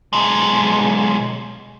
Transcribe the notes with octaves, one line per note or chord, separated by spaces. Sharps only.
B1 G#3